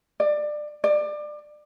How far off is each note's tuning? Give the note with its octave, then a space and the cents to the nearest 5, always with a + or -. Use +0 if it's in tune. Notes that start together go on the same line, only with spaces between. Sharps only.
D5 +20
D5 +25